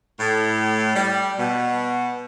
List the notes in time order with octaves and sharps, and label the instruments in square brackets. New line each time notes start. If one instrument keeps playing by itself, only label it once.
[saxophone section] A2
G3
B2